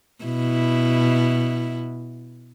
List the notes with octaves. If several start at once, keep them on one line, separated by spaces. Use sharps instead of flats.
B2 E4